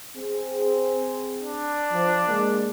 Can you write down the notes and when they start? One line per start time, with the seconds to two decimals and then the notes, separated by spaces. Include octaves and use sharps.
0.15 C4 G#4
1.41 D4
1.92 F3
2.26 C3 G#3 A#3